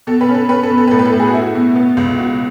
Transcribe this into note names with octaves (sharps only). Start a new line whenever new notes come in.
B2 A4
B4
C#4
A4
C#4 B4
A4
B2
A4
B4
A2 A4
B4
A4
A2
G#4
F#4
A3 E4
F#4
B2
B3
C#2
B2 F#4